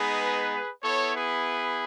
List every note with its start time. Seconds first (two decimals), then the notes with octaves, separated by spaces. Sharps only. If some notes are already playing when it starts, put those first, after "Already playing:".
Already playing: G#3 B3 D#4 G#4 B4
0.83 B3 E4 A4 C#5
1.16 G#4 B4